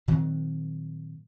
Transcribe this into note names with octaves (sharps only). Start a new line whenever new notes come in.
A#2 D#3 F#3 C4